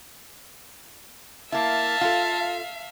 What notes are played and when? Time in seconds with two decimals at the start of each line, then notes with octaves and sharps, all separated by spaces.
1.52 A#3 E4 E5 F5 A5
2.01 F4 A4